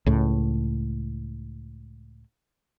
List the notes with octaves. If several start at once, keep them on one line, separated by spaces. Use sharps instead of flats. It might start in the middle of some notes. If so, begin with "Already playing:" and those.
C#2 A2